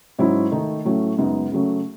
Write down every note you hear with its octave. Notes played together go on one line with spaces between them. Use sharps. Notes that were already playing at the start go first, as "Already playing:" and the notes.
G#2 F#3 C#4 E4
D#3 A3 D#4
A2 F#3 A3 C#4
F#2 C#3 G#3 B3 D#4
C#3 F#3 A3 C#4